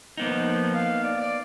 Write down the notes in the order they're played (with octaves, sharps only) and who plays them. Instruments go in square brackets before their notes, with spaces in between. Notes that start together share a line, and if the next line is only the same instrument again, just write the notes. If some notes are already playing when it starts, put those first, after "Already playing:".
[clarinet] F3 [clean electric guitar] A#3 B3 D#4
[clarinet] F5
D5
D5